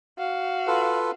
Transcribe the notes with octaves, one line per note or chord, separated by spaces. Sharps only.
F#4 F5
F4 A4 B4